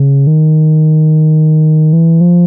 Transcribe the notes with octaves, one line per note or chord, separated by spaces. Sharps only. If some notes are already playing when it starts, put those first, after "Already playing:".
Already playing: C#3
D#3
E3
F3